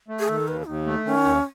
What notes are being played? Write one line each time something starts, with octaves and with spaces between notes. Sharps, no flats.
A3
G#4
D#3 A4
D#2 B4
D#2 D#4
A3
D#3 C#4
D#2